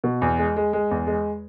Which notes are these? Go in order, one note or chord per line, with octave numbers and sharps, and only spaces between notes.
B2
E2
G#3
G#3
G#3
E2
G#3